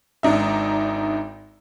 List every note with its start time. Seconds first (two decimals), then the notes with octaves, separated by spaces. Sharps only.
0.23 G#1 D4 D#4 E5